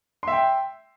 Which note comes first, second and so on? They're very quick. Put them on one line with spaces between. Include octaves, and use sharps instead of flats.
C6 E5 G5